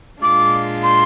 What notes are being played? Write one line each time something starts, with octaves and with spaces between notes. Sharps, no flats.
A#2 G#3 D4 F4 D6
C6